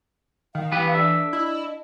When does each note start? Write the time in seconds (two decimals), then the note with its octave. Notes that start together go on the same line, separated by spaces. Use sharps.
0.55 D#3 F5
0.72 E3 B3 G4 B4
0.94 D4 A4 E5
1.33 E4 D#5